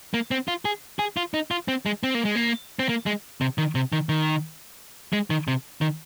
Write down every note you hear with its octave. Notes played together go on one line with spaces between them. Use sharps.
A#3
C4
F4
G#4
G#4
F4
D#4
F4
C4
G#3
C4
A#3
G#3
A#3
C4
A#3
G#3
C3
D#3
C3
D#3
D#3
G#3
D#3
C3
D#3